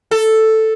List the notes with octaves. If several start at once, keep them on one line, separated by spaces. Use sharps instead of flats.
A4